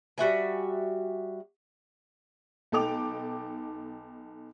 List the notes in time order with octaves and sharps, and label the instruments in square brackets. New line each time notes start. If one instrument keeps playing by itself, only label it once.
[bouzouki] G3 F#4 E5 G#5
[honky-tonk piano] B1 D#4 A4 G5 D6 F7